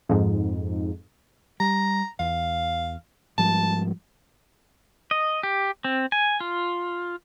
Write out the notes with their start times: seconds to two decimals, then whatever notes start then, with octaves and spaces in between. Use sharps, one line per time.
0.09 F2 G#2
1.60 G3 A#5
2.19 E2 F5
3.38 G#2 F3 G3 A5
5.11 D#5
5.43 G4
5.84 C4
6.12 G#5
6.40 F4